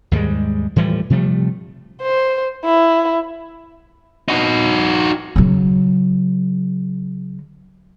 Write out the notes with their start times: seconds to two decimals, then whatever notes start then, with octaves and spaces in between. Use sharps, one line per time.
0.11 D#2 G#2 G3 G#3
0.76 A2 E3 F3 G3
1.10 C3 F3 G3 A3
2.02 C5
2.64 E4
4.28 D#4 F#4
5.36 C#3 F#3